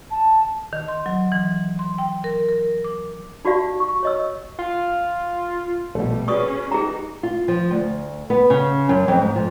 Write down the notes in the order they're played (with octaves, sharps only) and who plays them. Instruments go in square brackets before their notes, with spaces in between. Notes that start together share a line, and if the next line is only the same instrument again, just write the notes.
[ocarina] A5
[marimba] D#3
C6
F#3
E3
C6
G5
A#4
A#4
D6
[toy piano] D#4 F#4 G4 D5 F5
C#6
C#5 D#5 E6
[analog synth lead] F4
[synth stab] A#1 B2 [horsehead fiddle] G3 [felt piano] A3
[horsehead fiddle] C#4 G#4 [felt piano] F#4 B4 D5 [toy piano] C#6 D#6
[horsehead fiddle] D#4 [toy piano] G#4 A#5
[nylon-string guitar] F4
F3
D2
B3
C#3
F#2
F2
G#2
F3